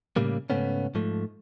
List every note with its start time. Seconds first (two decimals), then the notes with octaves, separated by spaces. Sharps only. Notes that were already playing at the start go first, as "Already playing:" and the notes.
0.16 A2 C#3 G3 A#3
0.50 G#2 C#3 A3 B3 C#4
0.95 G#2 F3 A3